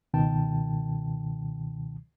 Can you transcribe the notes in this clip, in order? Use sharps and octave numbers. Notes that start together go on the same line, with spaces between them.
C#2 B2 D#3 G5 A5